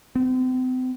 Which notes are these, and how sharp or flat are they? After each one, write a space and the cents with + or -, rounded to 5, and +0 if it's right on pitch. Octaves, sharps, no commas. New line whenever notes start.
C4 -40